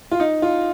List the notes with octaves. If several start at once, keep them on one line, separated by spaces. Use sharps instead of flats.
F4
D#4
F4